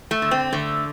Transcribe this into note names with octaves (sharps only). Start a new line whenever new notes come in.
A3
D3
C4
D3 A3